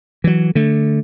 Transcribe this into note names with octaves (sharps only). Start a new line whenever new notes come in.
E3 F#3
D3 A3